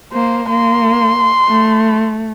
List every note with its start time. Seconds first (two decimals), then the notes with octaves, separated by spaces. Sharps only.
0.13 A#3 C5
0.50 A#3 C6
1.49 A3